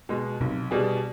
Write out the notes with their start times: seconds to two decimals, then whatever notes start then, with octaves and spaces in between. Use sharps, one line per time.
0.09 B2 G#3
0.41 B1 C3
0.71 B2 G3 D4 G#4